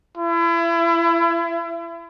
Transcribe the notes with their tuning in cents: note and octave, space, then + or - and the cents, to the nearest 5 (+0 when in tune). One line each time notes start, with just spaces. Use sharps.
E4 +35